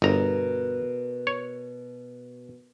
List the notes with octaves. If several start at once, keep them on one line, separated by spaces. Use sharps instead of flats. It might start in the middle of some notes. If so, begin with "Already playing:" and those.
G1 B2 A#4 A#5
C#5